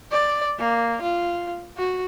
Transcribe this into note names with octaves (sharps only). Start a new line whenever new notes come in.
D5
A#3
F4
F#4